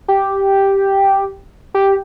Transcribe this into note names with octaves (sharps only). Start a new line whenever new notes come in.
G4
G4